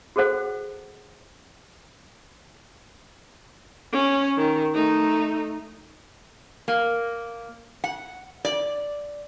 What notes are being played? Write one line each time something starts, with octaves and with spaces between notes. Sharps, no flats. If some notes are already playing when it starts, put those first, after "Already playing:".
F#4 G#4 A4 C5 F#5
C#4
D#3
A3 D#4
A#3
F#5
D5